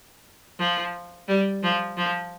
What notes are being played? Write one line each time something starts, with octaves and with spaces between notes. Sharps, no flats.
F3
G3
F3
F3